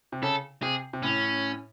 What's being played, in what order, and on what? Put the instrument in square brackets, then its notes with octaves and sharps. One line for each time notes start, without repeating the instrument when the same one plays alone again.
[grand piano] C3
[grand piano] C#3 [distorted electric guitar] A4
[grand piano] C3 [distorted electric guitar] G#4
[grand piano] C3
[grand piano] A2 [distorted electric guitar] C#4